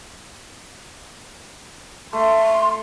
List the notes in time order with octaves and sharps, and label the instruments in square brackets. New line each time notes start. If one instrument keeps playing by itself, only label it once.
[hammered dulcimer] A3 [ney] C6